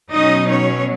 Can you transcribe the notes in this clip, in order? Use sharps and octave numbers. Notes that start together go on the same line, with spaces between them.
B2 F#3 C#4 D#4 D#5
C#4 C#5